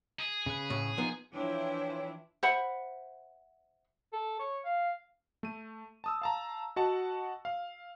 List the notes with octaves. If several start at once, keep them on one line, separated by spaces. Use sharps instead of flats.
G#4
C#3 B4
A2
F3 B3 D#4
E3 F3 D4 E4 C#5 G5 C6
C5 E5 F#5 B5
A4
C#5
F5
A3 D#7
A5 D#6 E6
F5 A5 A#5
F#4 D#5 F#5 A5
F5